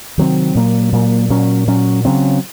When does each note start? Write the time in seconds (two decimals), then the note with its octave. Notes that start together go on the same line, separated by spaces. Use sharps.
0.18 C3 D#3 F#3 C4
0.55 A#2 F#3 A#3
0.92 A#2 F#3 A#3
1.30 A#2 F#3 C#4
1.67 A#2 F#3 C#4
2.05 C#3 F#3 C4